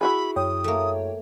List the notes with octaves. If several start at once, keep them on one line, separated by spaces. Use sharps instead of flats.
E4 F#4 G#4 B5
F#2 C#5 G5 D#6
A3 A#3